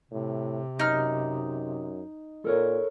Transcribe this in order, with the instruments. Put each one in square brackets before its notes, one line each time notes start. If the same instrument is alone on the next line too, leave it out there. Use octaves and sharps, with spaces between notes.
[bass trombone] A2 [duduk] C3
[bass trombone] F#2 [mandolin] D#4 F6
[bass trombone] A#2 [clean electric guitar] A4 A#4 C#5